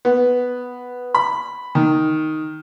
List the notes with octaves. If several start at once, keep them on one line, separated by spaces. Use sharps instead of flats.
B3
B5
D#3